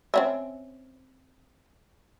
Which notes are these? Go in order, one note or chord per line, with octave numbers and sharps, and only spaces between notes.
C4 C#4 E5